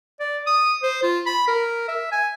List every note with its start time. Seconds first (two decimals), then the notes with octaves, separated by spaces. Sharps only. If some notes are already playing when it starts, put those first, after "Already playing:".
0.20 D5
0.46 D#6
0.83 C5
1.03 F4
1.26 B5
1.48 A#4
1.88 E5
2.12 G#5